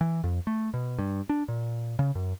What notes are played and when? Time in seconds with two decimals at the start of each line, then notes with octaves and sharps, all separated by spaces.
0.01 E3
0.24 F2
0.47 A3
0.74 B2
0.99 G2
1.29 D4
1.48 A#2
1.99 C#3
2.15 F#2